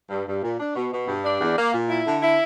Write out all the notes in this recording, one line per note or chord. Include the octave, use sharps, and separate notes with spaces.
G2
G2
A#2
D4
B2
B2
G2
D4
E2
A#3
A#2
E4
D3
E4